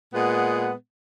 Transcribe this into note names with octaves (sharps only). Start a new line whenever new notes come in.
A#2 G#3 B3 F#5